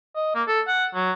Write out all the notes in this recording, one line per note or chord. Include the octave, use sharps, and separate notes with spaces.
D#5
A#3
A4
F#5
F#3